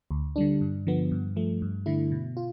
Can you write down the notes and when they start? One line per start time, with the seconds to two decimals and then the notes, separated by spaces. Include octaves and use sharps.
0.11 D2
0.36 D3 G3 D4
0.61 G2
0.87 D3 F3 B3
1.11 G2
1.36 F3 A3
1.62 G2
1.86 D3 A3 E4
2.12 B2
2.37 F4